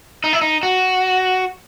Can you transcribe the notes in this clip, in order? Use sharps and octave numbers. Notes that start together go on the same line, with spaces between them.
D#4
E4
D#4
F#4